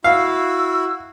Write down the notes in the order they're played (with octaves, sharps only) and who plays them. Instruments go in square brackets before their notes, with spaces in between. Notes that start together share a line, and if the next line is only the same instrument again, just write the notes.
[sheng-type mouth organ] E4 F#4 [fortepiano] F5 [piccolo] E6